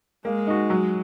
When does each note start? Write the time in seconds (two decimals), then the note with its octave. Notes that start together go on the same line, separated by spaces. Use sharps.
0.25 G#3 A#3
0.47 D#4 F#4
0.70 F#3